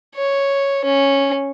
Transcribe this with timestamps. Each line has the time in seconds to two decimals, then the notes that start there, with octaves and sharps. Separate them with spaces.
0.16 C#5
0.85 C#4